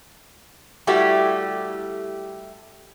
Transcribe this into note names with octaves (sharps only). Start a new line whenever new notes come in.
G3 A3 E4 F#4 G4